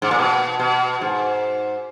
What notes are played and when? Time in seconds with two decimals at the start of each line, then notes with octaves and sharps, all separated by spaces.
0.02 G#2
0.11 A#2
0.18 B2
0.60 B2
1.01 G#2